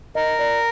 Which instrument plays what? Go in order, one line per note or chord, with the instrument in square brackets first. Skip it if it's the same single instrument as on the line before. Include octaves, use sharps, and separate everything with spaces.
[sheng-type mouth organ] A#4 [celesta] D#5
[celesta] D5